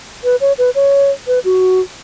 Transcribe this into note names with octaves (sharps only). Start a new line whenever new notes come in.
B4
C#5
B4
C#5
B4
F#4